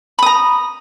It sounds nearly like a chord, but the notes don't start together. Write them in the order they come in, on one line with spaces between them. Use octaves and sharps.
B5 D#6 A#5